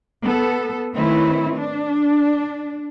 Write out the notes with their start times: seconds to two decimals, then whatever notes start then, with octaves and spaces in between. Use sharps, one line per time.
0.23 B3 A4
0.95 D#3 A3 C4 E4 B4 C#5
1.56 D4